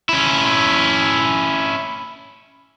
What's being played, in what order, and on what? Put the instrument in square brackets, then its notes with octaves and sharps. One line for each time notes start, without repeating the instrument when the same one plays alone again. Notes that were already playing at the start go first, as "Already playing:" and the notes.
[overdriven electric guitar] C#4 E4